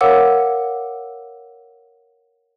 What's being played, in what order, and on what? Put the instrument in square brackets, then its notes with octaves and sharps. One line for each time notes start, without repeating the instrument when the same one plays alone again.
[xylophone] A#4 C#5 F5 F#5 D6 E6